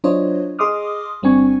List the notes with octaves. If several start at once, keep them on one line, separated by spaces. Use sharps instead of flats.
F#3 D4 F4 C5 C#5 D#5
G#4 D#5 C6 D6 D#6 F6
G1 G3 C4 D4 G#5 C#6